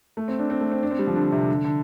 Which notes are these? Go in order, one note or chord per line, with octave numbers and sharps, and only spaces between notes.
A3
C4
D4
C4
A3
C4
D4
C4
G3
F3
D3
C3
D3
D3